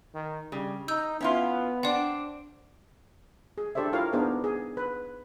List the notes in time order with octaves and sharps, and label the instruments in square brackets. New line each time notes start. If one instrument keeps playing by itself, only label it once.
[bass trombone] D#3
[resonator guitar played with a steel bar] C#3 [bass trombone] G3
[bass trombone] D#4 [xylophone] E6 G6
[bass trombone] B3 [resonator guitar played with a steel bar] C#4 E4 F4
[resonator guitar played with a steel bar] C4 D4 [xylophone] D5 F#5
[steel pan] G#4
D4 G4 A4 C5 D5 E5
E4 F4 G4 A#4 C#5 F5
B3 D4 D#4 G#4 A#4 C5
G#4
B4